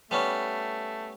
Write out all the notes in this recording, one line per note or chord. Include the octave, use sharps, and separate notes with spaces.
G3 A3 B3 C#4